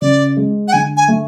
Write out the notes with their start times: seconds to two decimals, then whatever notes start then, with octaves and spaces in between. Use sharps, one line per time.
0.01 C#3 D5
0.37 G#3
0.68 F#5
0.73 D3 G#5
0.97 G#5
1.08 A3